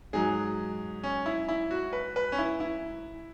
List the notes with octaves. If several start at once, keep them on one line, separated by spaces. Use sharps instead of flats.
G#2 F#3 G#4
C#4
E4
E4
F#4
B4
B4
C#4
E4
E4